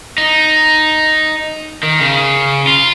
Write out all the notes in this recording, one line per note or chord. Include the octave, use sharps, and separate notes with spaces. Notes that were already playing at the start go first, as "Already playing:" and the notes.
D#4
D#3
C#3
F4